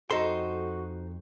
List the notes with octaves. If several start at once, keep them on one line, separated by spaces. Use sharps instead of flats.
F2 D#4 F#4 A4 C5 C6